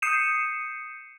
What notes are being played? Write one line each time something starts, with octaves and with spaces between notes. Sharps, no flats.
D#6 G6 C7 C#7 D#7 E7